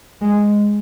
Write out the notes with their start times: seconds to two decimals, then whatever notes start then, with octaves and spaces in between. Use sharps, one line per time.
0.21 G#3